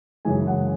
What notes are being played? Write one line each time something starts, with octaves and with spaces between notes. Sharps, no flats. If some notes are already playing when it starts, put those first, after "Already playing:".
F#2 C#3 E3 G#3 G#5
F#5